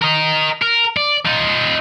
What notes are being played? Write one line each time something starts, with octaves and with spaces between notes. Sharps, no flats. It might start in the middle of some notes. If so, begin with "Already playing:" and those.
A#4 D#5
A#4
D5
D#4 F4